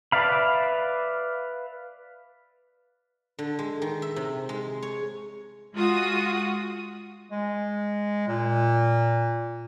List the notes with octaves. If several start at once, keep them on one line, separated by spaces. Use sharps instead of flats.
B4 D5 E5 F5 B5
D3
G#3
D#3
E5
C3
G#3
C#5
G#3 F4 F#4 D#6
G#3
A#2